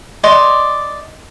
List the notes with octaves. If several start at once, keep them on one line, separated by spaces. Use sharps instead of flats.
D5 D#5 C6